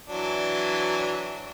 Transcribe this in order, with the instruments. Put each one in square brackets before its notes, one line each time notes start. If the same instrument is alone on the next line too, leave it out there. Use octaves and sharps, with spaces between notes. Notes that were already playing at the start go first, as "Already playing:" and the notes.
[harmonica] E3 F#3 D4